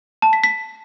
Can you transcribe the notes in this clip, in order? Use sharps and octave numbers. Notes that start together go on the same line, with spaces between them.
A5
B6
B6